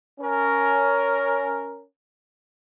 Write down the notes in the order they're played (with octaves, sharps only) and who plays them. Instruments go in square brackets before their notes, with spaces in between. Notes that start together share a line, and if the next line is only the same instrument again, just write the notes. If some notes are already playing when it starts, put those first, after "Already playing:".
[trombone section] C#4 A#4